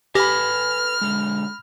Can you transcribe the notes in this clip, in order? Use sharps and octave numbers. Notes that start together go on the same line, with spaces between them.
G4 A4 B4 G#5 B5 F6 A#6
D3 G#3